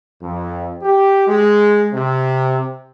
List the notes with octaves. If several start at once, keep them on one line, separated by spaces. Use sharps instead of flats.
F2
G4
G#3
C3